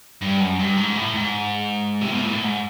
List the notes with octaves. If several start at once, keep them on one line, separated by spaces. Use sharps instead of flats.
G2
F#2
G2
G#2
A2
G#2
C3
B2
A#2
A2
G#2